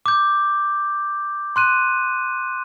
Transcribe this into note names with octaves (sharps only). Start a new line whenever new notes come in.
D6 G6
C6 F#6 D#7